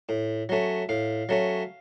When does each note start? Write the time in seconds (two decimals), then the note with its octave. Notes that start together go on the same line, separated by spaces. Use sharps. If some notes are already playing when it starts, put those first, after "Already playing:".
0.09 A2
0.49 F#3 A3 C#4
0.89 A2 F5
1.29 F#3 A3 C#4